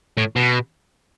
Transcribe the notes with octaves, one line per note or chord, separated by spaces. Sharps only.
A2
B2